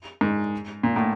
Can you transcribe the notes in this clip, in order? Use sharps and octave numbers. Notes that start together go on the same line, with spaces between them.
G#2
A#2
A2